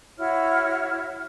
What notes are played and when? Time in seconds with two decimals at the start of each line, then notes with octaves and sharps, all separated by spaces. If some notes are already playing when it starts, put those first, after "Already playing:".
0.18 E4 F#4 C#5 F6